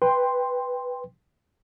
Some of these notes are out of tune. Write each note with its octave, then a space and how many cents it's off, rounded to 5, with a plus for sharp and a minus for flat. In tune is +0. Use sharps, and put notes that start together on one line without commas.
B4 +0 G5 +15 C6 +0